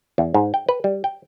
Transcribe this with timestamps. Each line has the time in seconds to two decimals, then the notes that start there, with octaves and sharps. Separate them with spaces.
0.18 E2
0.34 G#2
0.54 G5
0.69 B4
0.84 G3
1.04 G5